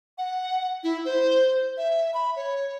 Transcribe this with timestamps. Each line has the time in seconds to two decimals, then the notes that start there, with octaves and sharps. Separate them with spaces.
0.18 F#5
0.84 E4
1.05 C5
1.78 E5
2.14 B5
2.36 C#5